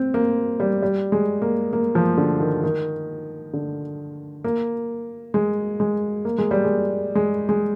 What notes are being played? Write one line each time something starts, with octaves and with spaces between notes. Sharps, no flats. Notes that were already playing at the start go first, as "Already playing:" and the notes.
Already playing: C4
A#3
G3
G3
G#3
A#3
A#3
F3
D3
D#3
D#3
D3
A#3
G#3
G#3
A#3
G#3
G3
G#3
G#3
G#3